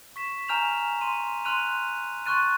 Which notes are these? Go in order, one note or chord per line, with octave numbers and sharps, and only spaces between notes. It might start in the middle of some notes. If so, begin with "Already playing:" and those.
C#6 B6 E7
G#5 A#5 F6 G6 E7 F7
C6 D#7
C6 F6 F#6 D#7 F7
C6 C#6 F6 F#6 A6 D#7